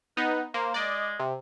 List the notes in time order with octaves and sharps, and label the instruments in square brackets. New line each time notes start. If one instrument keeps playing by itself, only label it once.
[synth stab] B3 D#4 [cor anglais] B4
[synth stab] A#3 [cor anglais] C5
[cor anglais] G#3 [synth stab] D5 D#5
[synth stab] C3